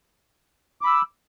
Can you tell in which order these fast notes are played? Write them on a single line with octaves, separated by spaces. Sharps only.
D6 B5 E6